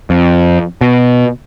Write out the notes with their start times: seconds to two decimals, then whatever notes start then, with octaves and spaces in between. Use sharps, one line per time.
0.10 F2
0.81 B2